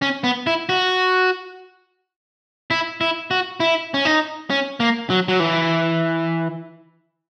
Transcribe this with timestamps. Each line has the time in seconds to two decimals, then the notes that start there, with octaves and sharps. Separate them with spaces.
0.02 C#4
0.24 B3
0.47 E4
0.69 F#4
2.71 E4
3.01 E4
3.31 F#4
3.60 E4
3.94 C#4
4.05 D#4
4.50 C#4
4.80 A#3
5.10 F#3
5.28 F#3
5.40 E3